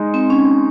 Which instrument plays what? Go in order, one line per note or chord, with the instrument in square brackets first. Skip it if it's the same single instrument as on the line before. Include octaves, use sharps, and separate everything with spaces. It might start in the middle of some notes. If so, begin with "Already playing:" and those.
Already playing: [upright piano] G#3 D#4
[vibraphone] C4
C#4